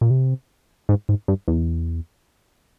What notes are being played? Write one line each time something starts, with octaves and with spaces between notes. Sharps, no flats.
A#2
C3
G#2
G#2
G2
E2